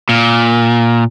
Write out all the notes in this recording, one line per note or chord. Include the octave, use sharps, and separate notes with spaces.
A#2